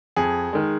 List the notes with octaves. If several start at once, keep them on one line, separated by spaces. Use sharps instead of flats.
F2 G#4
D#3 G#3